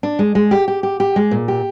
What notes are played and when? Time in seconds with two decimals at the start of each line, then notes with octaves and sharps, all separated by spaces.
0.03 D4
0.19 G#3
0.35 G#3
0.51 G4
0.68 G4
0.83 G4
1.00 G4
1.16 G#3
1.31 A#2
1.48 G4